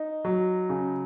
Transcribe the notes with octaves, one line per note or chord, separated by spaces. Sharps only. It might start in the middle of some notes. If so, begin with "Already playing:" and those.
Already playing: D#4
F#3
C#3